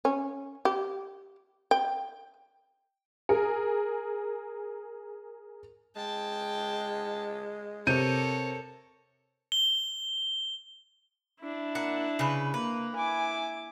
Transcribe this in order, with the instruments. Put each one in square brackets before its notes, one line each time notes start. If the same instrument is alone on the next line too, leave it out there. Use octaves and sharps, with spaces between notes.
[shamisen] C#4
G4
G5
[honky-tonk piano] G#4 A#4
[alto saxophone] G#3 [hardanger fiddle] G5 [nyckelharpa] A5
[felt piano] C3 G6 D#7 [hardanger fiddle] A4 [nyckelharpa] A#4 C#5
[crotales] G7
[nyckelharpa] D4 E4
[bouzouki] A#3 F#5
C#3 B4
[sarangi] A#3 [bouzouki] B4
[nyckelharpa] E4 D6 [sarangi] G#5